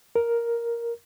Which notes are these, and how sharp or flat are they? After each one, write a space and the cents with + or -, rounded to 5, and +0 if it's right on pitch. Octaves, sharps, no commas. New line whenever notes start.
A#4 +5